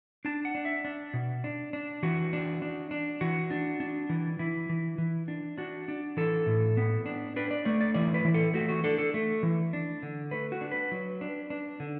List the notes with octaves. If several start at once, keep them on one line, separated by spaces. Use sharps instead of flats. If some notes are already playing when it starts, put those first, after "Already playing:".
D4 A5
F#5
D4
E5
D4
B2
D4
D4
E3 F#4
D4
D4
D4
E3 F#4
D4
D4
E3
E3 E4
E3
E3
D4
D4 F#4
D4
E3 A4
A2
B3
D4
D4 B4
D5
A3 D5
D5
E3 D5
B4
E3
A4
A3 F#4
F#4
D4 A4
A4
A3
E3
D4
D3
A3 B4
F#4
D4
B4
F#3
D4
D4
D3